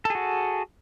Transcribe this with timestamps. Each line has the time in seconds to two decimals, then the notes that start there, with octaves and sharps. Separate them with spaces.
0.05 A4
0.10 G#4
0.15 F#4